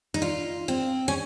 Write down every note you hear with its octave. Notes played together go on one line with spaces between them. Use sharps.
D#4
F4
C4
C#4